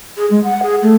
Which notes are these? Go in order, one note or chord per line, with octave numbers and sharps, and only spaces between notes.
G#4
G#3
F#5
G#4
A3